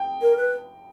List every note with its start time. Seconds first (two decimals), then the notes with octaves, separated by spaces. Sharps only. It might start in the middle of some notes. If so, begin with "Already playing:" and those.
Already playing: G5
0.22 A#4
0.37 B4